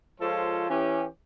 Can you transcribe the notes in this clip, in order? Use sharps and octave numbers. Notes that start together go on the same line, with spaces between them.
F3 G#3 F4 A4 C5 C#5
E3 C#4 G4